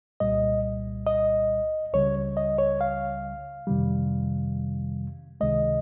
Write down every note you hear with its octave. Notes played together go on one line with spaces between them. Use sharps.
C2 A#2 G3 D#5
D#5
C#2 C#3 G3 C#5
D#5
C#5
F5
F2 C3 D#3 G3
C#2 C3 D#3 G#3 D#5